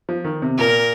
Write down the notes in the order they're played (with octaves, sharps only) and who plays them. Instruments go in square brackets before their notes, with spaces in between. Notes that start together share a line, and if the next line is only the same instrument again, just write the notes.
[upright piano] F3
D#3
C3
[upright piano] A#2 [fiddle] A#4